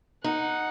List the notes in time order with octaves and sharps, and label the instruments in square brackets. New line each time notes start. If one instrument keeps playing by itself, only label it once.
[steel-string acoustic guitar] D#4 [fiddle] F#5